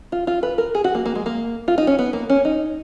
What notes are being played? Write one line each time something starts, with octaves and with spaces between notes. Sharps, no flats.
F4
F4
B4
A#4
G#4
F#4
A#3
A#3
G#3
A#3
F4
D#4
C#4
B3
A#3
C#4
D#4